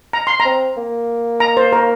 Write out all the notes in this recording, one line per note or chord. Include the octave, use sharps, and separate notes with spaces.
A#5
C6
A#5
C4
A#3
A#5
C5
A#4